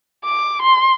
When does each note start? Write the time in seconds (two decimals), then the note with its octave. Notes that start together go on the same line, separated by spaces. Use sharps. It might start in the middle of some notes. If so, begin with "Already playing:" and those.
0.24 D6
0.62 C6